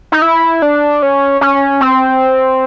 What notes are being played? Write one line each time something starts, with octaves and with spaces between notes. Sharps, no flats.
D#4
E4
D4
C#4
C#4
C4